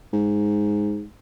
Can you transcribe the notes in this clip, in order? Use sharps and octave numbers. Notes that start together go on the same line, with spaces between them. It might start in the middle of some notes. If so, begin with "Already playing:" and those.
G#2